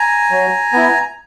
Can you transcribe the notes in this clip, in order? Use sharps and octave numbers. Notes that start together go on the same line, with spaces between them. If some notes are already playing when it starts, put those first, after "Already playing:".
Already playing: G#5 A#5
F#3
B3 E4